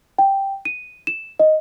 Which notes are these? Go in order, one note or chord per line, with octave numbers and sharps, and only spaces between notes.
G5
D#7
E7
D#5